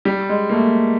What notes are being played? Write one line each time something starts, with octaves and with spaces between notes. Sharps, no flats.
G3
G#3
A#3
A3